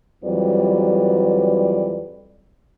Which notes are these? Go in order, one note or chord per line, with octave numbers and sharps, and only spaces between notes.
F2 E3 F#3 G3 B4 D5